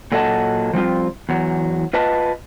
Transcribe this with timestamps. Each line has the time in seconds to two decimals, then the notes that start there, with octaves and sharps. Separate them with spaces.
0.12 A#2 F#3 A4 D#5 F#5 A5
0.73 F3 G3 C4 F4
1.29 E2 F#3
1.93 F4 B4 D#5 A5